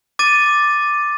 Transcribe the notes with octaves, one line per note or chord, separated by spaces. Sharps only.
D6 A6 D#7